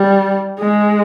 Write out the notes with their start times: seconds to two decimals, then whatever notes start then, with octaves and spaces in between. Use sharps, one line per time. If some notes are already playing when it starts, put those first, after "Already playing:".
Already playing: G3
0.59 G#3